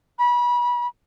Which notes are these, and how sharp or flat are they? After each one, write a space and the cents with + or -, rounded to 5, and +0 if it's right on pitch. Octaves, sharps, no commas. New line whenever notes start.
B5 -30